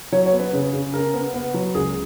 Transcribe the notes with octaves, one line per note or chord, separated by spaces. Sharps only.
F#3 C#5
C#5
B3
B4
C#3
C#3
C#3 A#4
B3
B3
F#3
C#2 G#4